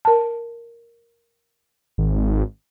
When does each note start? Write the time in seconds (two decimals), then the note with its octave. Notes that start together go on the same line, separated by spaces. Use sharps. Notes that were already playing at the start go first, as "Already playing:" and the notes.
0.05 A#4 A5
1.98 G#1